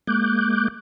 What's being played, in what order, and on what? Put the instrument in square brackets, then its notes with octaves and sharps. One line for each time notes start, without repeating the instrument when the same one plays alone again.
[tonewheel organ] G#3 A#3 D6 F#6 G6